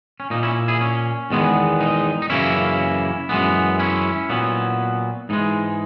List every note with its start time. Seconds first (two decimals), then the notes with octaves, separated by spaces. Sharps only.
0.20 C#4
0.30 A#2 A#3 D#4
0.43 C#4 E4
0.68 E4 G#4
0.81 C#4
1.31 E2 D#3 G#3 B3
1.80 D#4
2.22 D#4
2.30 F#2 C#3 E3 A#3 C#4 E4
3.29 F#2 E3 G#3 B3
3.79 C#4 E4
4.29 A#2 F#3 B3
5.29 G#2 E3 G#3 D#4